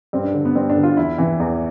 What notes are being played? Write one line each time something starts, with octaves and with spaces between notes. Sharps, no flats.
G2 C4
D4
D3
B3
G2 C4
D4
D3
F4
E2 E4
C3 E3
E2